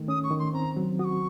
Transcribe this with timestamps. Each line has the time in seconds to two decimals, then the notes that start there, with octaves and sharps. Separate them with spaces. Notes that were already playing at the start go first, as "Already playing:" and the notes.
Already playing: D#3 A3
0.08 C#4 D#6
0.24 C#6
0.31 D#3
0.39 C6
0.53 C4 A#5
0.77 F#3
0.99 F#4 D#6
1.04 C#6